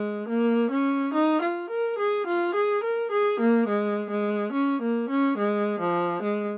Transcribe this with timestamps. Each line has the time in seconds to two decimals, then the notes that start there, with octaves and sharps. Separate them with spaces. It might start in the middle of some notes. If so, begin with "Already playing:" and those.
Already playing: G#3
0.29 A#3
0.71 C#4
1.14 D#4
1.42 F4
1.70 A#4
1.99 G#4
2.27 F4
2.55 G#4
2.84 A#4
3.12 G#4
3.40 A#3
3.68 G#3
4.10 G#3
4.53 C#4
4.82 A#3
5.10 C#4
5.38 G#3
5.80 F3
6.23 G#3